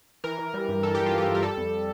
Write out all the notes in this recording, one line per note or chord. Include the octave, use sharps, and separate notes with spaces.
E3 A#4
E3
G3
G2
E3 A4
G2 G4
F4
G2 G4
G2
A#4
G3 A4
F2